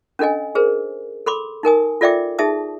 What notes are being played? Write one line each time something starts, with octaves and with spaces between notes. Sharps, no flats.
C#4 D4 A4 D#5 G#5
G#4 A#4 C5
A4 B5 C6 D6
D#4 A#4 G#5 D#6
F4 A4 D5 E5 G5 D6
D#4 G#4 E5 A5 D#6